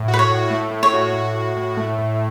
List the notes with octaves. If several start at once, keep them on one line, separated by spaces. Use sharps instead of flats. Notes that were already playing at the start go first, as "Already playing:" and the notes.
Already playing: A2
F#4
B4
C#5
A2
A3
A2
C#5
F#4
A2
F#4
A2
A3
A2